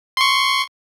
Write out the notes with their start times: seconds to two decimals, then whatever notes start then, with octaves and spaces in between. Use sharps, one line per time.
0.17 C6 C#6